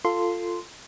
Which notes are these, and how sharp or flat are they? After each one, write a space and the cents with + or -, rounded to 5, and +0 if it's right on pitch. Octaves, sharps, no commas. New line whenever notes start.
F4 +0 A4 +15 C6 -10